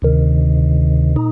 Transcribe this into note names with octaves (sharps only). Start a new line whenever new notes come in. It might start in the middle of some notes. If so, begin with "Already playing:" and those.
D2 C3 D#3
A#2 D#4